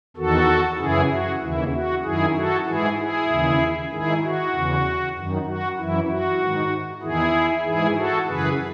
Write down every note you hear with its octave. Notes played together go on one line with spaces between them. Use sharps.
E2 D#3 F#4 A4
F#2 C#3 E3 E4 G#4
F#4
D#2 C#3 E3 E4
F#4
F#2 D#3 E4 G#4
F#4 A4
G#2 E3 E4 G#4
E4 G#4
D#2 C#3 E3
G#2 D#3 E4 G#4
F#4
E2 C#3 E3
F#2 D#3
F#4
F#2 E3 E4
F#4
G#2 D#3
E2 D#3 E4 G#4
G#2 E3 E4 G#4
F#4 A4
F#2 C#3 E3 G#4 B4